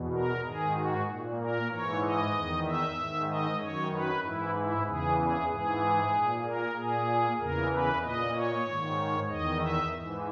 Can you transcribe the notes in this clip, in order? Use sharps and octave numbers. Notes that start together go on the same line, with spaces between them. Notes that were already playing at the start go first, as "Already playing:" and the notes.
Already playing: E2 B2
A#4
G#2 D#3 G#4
F#4
A#2
A#4
G#2 E3 C#5
D#5
E2 D#3
E5
G#2 D#3
D#5
F#2 D#3 C#5
B4
G#2 E3 E4
E4
E2 C#3 E3 G#4
G#4
G#2 E3 G#4
A#2
A#4
A#2 G#4
E2 C#3 E3 A#4
B4
A#2 D#5
C#5
G#2 D#3
E2 D#3 D#5
E5
G#2 E3